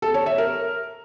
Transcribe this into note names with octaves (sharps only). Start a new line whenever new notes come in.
A4
C#5
E5
A#4